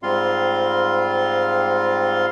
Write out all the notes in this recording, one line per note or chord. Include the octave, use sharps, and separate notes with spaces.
G#2 G3 C4 F4 F5 C6